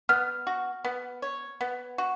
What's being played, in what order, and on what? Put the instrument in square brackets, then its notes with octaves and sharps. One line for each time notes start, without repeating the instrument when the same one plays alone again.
[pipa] B3 [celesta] F6
[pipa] F#4
B3
C#5
B3
F#4